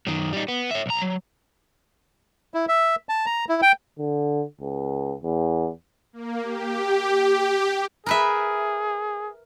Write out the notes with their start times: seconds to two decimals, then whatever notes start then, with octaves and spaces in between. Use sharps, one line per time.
0.07 F#2 D#3
0.33 G3 D#4
0.48 B3
0.71 C#5 E5
0.86 B1 A#5
1.02 F#3
2.54 E4
2.68 E5
3.09 A5
3.26 A#5
3.49 E4
3.62 G5
3.99 D3
4.61 C#2
5.23 E2
6.13 A#3
6.43 G4
8.06 G#4 A#4 B4 E5